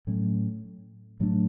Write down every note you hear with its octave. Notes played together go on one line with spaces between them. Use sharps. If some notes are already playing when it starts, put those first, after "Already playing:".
A2 F#3 A3 C#4
A2 F#3 A3 D4